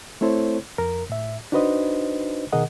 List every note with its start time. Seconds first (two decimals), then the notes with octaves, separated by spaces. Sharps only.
0.21 A3 C4 E4 A4 C5 C#5
0.78 F2 A#4
1.10 A2 E5
1.52 D4 D#4 F#4 B4 C5 D#5
2.52 B2 D#3 G#4 A#4 D#5 F#5